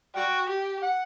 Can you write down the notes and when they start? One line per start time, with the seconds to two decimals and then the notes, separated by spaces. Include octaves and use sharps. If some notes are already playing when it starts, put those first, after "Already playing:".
0.15 F#4 D5 G5
0.49 G4
0.83 F#5